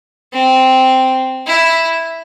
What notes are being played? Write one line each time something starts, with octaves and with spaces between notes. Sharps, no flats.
C4
E4